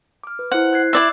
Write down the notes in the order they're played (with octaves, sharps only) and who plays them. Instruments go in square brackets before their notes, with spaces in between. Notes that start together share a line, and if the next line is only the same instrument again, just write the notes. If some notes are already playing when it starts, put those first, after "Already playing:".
[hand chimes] D6 F6
B4
[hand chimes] E4 C5 [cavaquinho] F#5
[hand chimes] F#6 G#6 C7
[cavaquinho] E4 D5 E5